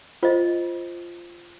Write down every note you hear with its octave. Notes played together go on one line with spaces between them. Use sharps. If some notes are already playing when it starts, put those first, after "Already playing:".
F4 C5 D#5